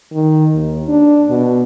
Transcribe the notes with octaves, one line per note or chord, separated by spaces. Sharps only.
D#3
D#2
D4
B2